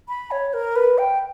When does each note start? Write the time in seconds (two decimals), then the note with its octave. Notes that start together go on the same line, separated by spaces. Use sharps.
0.08 B5
0.31 C#5
0.54 A#4
0.76 B4
0.98 G5